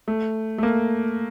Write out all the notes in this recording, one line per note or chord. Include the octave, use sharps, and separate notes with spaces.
A3
A3
A#3